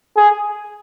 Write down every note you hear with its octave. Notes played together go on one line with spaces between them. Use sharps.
G#4